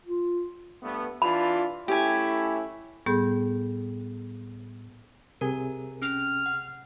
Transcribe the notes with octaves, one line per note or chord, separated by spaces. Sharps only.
F4
G2 A3 B3
E3 D4 F4 B5
A3 C#4 E4 G4 G#5
A2 G3 B3 G#4 G6
C2 C3 G#4 A#4
C#4 F6
F#5